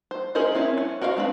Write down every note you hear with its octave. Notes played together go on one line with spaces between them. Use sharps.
C5
C#4 G#4 A#4 C5 D#5
C4 C#4 E4
C#4
F#4 A#4 C5 E5 F5
G#3 C4 D4 B4